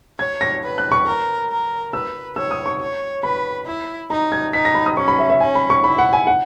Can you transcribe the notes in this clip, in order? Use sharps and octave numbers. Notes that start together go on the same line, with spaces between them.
C#5 G#6
A#6
B4
F#6
C#6
A#4
A#4
B4 E6
C#5 E6
D#6
C#6
C#5
B4 B5
E4
D#4 A#5
G#6
D#4 B6
A#6
B5
D#6
C#4 C#6
B5
E5
E5
C#4 G#5
B5
C#6
E4 B5
F#5
G#5
F#5